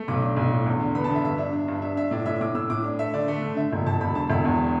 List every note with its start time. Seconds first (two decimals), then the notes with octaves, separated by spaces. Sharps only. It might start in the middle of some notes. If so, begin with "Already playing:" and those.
Already playing: A3
0.08 B1 D6
0.23 D4
0.37 B1
0.51 A2
0.66 E2
0.80 D3
0.95 B3 B5
1.04 A5
1.10 D3 E5
1.24 G2 E5
1.38 D4 E5
1.53 D4
1.68 G2
1.82 D4 E5
1.97 D4 E5
2.11 A2 D5
2.26 A2 E5
2.41 A2 D6
2.55 A2 E6
2.70 A2 D6
2.84 D4
2.99 A3 E5
3.14 D3 D5
3.28 A3
3.42 D3
3.57 D3 E5
3.72 E1
3.86 E1 A5
4.01 E1 B5
4.15 D3 A5
4.30 E1 E5
4.45 E2